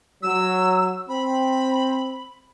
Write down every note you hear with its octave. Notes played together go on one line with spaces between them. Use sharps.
F#3 E6
C4 B5